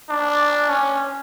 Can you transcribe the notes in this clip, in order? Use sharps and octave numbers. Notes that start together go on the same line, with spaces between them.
D4
C#4